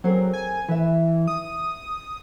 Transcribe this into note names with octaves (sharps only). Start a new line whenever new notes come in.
F#3 C4 G#4 A#4
G#5
E3 B4 E5
D#6